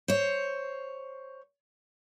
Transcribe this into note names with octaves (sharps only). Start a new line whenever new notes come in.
C5 C#5